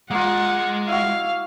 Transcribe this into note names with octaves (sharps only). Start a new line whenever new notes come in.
G#3 A#3 F4 F#5
E4 F#4 F5